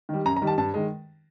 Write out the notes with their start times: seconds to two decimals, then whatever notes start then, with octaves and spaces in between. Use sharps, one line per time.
0.09 D#3 G3
0.25 F#2 A#5
0.36 A#5
0.42 D#3 G3
0.47 A5
0.58 G2 A5
0.74 D#3 G#3